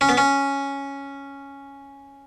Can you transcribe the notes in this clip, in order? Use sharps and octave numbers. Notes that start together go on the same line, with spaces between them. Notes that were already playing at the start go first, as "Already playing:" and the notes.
C#4
B3
C#4